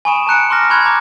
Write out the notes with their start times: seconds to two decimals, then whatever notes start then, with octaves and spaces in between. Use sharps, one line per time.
0.05 G#5 B5 C#6 D#6 D7 E7
0.27 A5 A#5 F#6 C#7 D7
0.50 C6 D6 F6 A#6
0.70 A#5 B5 C#6 F#6 G#6
0.85 A#5 D6 G#6